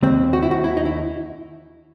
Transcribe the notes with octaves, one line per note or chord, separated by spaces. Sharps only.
D#2 C4
F#4
E4
D#2 F#4
E4
D#4
E4